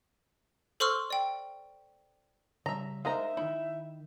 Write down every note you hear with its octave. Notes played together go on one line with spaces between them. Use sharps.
A4 C5 C6 C#6 E6 F6
D5 G5
C#3 G3 E5 A#5
G#3 D#4 A#4 C5 E5 F5 A#5
D#3 D#4 E4